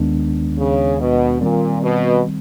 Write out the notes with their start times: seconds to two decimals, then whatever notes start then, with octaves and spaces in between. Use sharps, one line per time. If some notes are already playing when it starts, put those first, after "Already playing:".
Already playing: D#2 D#3 G#3 B3 D4
0.59 C#3
1.00 B2
1.41 A#2 D#3 G3 C4
1.82 B2